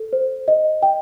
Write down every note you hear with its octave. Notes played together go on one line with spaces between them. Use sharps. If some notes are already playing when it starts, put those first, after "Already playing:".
Already playing: A4
C5
D#5
G5